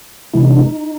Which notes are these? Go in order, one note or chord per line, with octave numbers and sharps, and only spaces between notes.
C3 E3 G#3 E4
D#4
D4
D#4